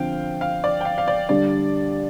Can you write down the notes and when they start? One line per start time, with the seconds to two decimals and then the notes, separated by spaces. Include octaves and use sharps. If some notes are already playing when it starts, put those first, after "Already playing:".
Already playing: D3 F3 C4 F5 G5
0.41 F5
0.64 D5
0.81 G5
0.85 F5
0.98 F5
1.08 D5
1.29 D3 G3 D4 D5